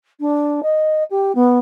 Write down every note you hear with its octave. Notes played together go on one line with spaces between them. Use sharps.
D4
D#5
G4
B3